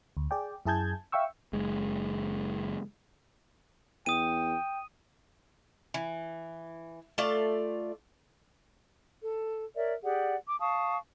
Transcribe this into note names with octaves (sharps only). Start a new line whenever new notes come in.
D2
G#4 D5 G5
F#2 E4 G#4 A5 G6 G#6
E5 F5 G5 C#6 E6
F#1 G#3
E2 G5 D#6 D#7
E3
A3 F4 D5 A5
A4
A#4 C#5 D5 E5
G4 G#4 D5 F#5
D6
F5 A5 C#6 D#6